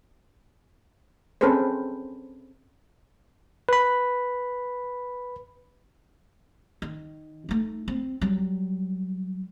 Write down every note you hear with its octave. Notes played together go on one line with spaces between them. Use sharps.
C4 C#4 G#4 A4 B4 C5
B4 B5
D#3
A3 D#4
C4
F#3 G3